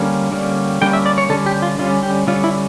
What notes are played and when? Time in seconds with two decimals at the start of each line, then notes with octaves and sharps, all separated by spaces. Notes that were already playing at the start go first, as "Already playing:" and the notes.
Already playing: D3 G3 A#3 C#4
0.32 D3 G3 A#3 C#4
0.81 D3 G3 A#3 C#4 G5
0.93 E5
1.06 D5
1.18 C#5
1.29 D3 G3 C#4 A4
1.46 G4
1.62 F4
1.79 D3 G3 C#4 F4
2.03 G4
2.27 D3 G3 C#4 F4
2.44 E4